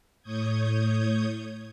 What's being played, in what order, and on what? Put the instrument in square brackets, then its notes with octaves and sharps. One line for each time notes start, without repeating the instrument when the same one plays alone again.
[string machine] A2 C#5 D#6 G6 G#6